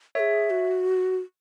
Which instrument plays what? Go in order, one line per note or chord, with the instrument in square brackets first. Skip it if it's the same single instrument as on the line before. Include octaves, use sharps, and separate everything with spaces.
[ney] A#4 [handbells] C#5 E5
[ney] G#4
F#4